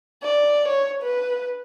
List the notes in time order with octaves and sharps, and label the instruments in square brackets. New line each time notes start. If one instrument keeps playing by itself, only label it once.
[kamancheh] D5
C#5
B4